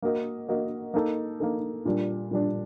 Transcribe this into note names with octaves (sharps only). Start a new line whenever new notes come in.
A#3 F#4 A#4 D#5
A#3 F#4 A#4 D#5
A#3 D#4 A4
A#3 D#4 A4
A#2 G3 D4
A#2 G3 D4